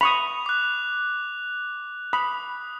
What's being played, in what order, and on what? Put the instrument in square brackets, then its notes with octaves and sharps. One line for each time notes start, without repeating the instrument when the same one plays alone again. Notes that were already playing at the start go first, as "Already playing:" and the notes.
[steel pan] B5 C#6 D#6 [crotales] F7
[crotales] D6 F#6
[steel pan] B5 [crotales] D#6